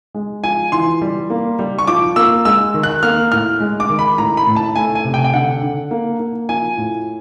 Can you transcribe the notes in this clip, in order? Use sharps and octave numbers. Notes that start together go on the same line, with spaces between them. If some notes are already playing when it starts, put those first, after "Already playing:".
G#3
F3 G#5
E3 C6
G3
A#3
G3
C#6
F3 D6
A#3 E6
G#3 E6
D#3
F#6
A#3 F6
A2 F6
G#3
D6
D#3
B5
A2 A#5
B5
A2
A5
A3 G#5
G#5
C3
G5
G5
D3 F#5
D3
A#3
A#3
F3 G#5
A2